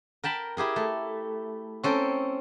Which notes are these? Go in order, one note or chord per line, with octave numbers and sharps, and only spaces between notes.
A#4 G5 A5 B5
E4 G4 G#4 A#4
A3
C4 C#4 A4 G5 A#5